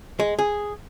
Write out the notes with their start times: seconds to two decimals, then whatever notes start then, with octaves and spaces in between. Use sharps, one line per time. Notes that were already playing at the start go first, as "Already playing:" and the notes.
0.20 G#3
0.39 G#4